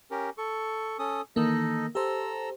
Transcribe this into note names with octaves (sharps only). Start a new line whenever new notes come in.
C#4 G4 A#4
A4 C#6
C#4 A4 D#6
D#3 E3 A#3 D#4 A4 D#5
G4 A4 C5 A#5 E6